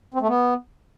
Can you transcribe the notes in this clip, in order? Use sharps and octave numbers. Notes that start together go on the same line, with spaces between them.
C4
A3
B3